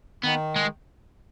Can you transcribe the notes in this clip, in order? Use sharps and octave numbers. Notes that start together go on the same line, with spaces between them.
D#3 B3
G#3